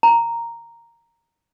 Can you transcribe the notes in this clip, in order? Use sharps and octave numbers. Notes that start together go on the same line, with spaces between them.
A#5